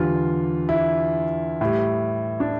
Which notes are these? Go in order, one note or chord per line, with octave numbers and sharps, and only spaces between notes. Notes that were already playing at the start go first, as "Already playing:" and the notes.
Already playing: E2 D3 G3 F4
E4
A2 G3
D4